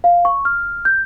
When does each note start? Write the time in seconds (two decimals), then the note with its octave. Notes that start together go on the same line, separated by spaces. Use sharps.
0.04 F5
0.25 C#6
0.45 F6
0.85 G6